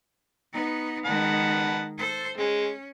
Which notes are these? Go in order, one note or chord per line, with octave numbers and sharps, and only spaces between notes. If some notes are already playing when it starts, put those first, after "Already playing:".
B3 D#4
D#3 G#3 F#5 A5 B5
A4 C5
G#3 C#4